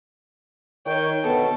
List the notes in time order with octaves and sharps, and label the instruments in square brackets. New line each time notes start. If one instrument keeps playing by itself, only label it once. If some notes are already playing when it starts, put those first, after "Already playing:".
[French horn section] D#3 C#5 [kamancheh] G5
[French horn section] D2 B2 B3 [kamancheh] A4